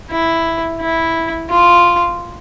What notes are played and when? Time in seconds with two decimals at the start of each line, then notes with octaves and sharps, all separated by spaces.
0.10 E4
0.81 E4
1.50 F4